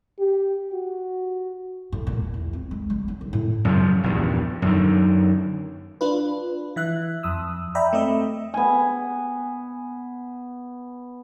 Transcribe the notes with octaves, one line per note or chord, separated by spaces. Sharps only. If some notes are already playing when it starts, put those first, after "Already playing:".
G4
F#4
A2
A#2
E2
E2
C4
G#3
G3
C#4
D#3
A2
F#2 C#3 F3
A#1 E2 G2
F#2 D3 D#3
D4 F4 B4
E3 E5 F#6
F2 D#6 E6
D5 E5 G5 A#5 B5
A3 C4 D#5 E5
B3 G#5